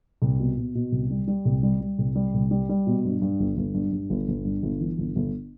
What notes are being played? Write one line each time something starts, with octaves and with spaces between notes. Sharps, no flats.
C2
B2
B2
B2
C2
G3
G3
C2
G3
G3
C2
G3
C2
G3
G3
B2
G2
G2
G1
G1
G2
G2
G1
G1
G2
G1
E3
G1
G1